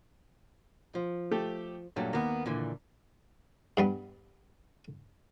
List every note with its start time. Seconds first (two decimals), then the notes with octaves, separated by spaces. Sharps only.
0.95 F3
1.31 A3 G4 A4
1.96 G2 A#2 F#3 A3
2.13 D#2 A#3 B3
2.46 A#2 D3 E3
3.77 G2 G3 B3